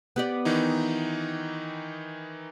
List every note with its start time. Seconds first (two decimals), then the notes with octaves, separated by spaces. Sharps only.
0.16 B3 G4 D5
0.45 D#3 E3 D#4